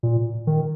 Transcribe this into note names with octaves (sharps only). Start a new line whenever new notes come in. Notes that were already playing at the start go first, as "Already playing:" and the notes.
A#2
D#3